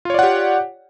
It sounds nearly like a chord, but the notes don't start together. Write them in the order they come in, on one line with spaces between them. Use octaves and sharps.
F4 C#5 D5 F#5 G4